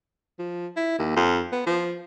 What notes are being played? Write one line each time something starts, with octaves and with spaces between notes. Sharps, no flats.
F3
E4
D#2
F2
B3
F3